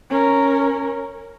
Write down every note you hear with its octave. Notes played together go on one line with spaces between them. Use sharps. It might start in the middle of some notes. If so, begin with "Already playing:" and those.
C#4 A#4